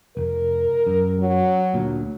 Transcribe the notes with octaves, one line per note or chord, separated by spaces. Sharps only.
F1 A#4
F#2
F#3
D2 A#2